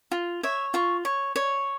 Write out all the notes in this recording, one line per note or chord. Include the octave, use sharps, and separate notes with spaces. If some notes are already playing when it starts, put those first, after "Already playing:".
F4
C#5 E5
F4 C#6
C#5
C#5